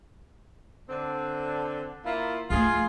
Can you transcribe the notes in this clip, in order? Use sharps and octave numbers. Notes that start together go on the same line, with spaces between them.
D3 C4 D4
A#3 E4 F4
F3 A3 F4 G#4